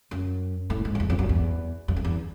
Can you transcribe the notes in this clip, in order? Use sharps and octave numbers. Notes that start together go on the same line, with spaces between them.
F#2
A2
G#2
F2
E2
F2
F#2
E2
F#2
F2
E2